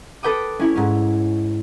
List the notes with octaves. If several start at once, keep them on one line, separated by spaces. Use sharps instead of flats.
A4 B4 G5 D6 D#6
C#4 E4 C#5
G#2 C#4